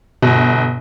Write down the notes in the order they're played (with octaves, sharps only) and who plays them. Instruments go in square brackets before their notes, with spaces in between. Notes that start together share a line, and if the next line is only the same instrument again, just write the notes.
[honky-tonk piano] G1 [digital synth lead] B2